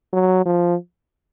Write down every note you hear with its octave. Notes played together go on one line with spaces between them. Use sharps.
F#3
F3